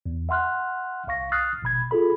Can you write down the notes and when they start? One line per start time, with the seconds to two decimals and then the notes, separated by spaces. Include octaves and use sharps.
0.06 E2
0.29 E5 F#5 C6 F6 F#6
1.07 C2 F5 C#6 A#6
1.32 D#6 F6 F#6 A6 C7
1.62 G#1 B2 B5 G#6
1.91 F4 G#4 A4 B5